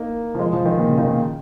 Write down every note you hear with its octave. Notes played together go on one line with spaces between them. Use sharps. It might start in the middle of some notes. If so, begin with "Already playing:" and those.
Already playing: A#3 D#4
F3
G#3
F3
D#3
A#2
C#3
D#3
A#2